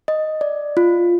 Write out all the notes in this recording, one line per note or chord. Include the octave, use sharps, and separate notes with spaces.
D#5
D5
F4